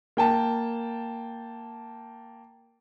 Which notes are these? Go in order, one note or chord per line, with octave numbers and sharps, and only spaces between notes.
A#3 G5 A5